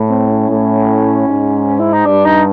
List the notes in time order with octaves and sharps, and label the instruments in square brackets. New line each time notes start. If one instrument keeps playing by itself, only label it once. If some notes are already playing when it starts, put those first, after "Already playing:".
Already playing: [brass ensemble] A2
[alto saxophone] C4
C#4
[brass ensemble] A2
G#2
[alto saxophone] E4
D#4
[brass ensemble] G2 [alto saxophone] D4
[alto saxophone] D#4